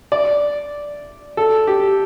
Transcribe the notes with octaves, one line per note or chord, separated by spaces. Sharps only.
D5
A4
G4